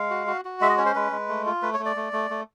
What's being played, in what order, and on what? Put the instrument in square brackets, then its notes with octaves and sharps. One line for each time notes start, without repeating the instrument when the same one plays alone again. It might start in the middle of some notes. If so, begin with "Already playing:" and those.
Already playing: [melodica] G#3 F5
F#4
F#4
F#4
G#3 E5
D#5
C#4 C#5
C5
G#3 B4
G#3
A3
F4
A3 B4
C#5
A3
D5
A3
A3
A3